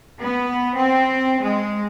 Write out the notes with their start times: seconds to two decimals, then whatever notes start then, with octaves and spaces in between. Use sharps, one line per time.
0.20 B3
0.75 C4
1.43 G#3